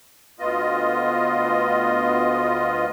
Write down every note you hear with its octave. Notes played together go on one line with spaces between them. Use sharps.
D2 B3 F4 D#5